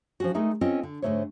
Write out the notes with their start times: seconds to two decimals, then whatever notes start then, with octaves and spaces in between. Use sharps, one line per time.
0.20 F3 C#4 F#4
0.34 G#3 A3 D#4 G#4 A#4
0.61 C4 C#4 F4 A4 D#5
0.83 D3
1.02 G#2 D3 F#3 A3 C5 C#5